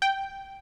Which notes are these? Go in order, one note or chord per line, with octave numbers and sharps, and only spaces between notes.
G5